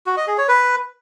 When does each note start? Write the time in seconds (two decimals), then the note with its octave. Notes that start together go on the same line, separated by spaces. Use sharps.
0.06 F#4
0.17 D#5
0.27 G#4
0.38 C#5
0.48 B4